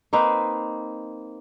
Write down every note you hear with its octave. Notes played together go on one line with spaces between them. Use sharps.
A#3 C4 D#4 B4